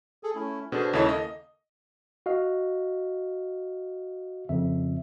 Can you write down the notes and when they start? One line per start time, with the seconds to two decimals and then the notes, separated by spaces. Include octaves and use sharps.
0.23 G#4 A4
0.35 A3 C#4 E4
0.72 B2 D4 G#4 A4 C5
0.93 D#2 C#3 G#3 E4 A4 C#5
1.09 A#3 A4 D#5
2.26 F#4 D#5 F5
4.49 F2 C#3 E5